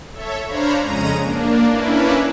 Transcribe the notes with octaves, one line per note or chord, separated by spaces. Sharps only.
A4 C#5 E5
D4 C5 C#5 F5 A#5 B5
F2 C#3 G#3 C#4 A#5 D#7
A#3 D4
A#3 C#4 D4 E4 B4